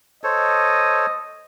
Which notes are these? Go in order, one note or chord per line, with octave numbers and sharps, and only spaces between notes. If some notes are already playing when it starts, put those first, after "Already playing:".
A4 C5 C#5 D#5